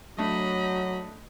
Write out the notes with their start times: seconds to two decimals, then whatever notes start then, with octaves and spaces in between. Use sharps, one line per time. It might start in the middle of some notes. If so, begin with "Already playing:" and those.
0.18 F#3 A3 D4 D#5 B5